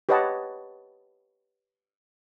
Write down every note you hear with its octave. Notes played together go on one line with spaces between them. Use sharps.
G4 B4 C#5 D#5 F#5 A5